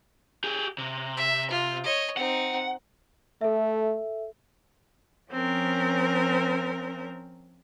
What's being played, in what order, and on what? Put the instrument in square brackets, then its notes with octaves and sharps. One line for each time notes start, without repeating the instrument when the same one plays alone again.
[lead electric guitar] G4 G#4
C3
[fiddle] E5
F4
C#5 D#5
[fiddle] C4 D#4 [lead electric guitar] F#5
[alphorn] A3 [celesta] A4 E5
[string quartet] F3 C4 C#4 A#4